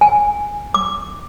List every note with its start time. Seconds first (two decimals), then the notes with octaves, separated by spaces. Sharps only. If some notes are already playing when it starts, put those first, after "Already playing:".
0.01 G#5
0.74 D6